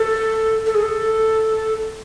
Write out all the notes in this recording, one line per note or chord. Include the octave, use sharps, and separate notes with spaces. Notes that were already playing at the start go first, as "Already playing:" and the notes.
Already playing: A4
A4
G#4
A4